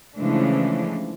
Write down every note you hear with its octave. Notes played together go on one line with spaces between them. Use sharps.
C#3 E3 F3 G#3 A3 D4